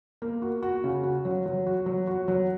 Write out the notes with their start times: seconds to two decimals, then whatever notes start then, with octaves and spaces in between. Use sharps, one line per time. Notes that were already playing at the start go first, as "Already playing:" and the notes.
0.22 A#3
0.42 F#4
0.63 F#4
0.84 C#3
1.03 F#4
1.25 F#3
1.46 F#3
1.67 F#4
1.86 F#3
2.07 F#4
2.28 F#3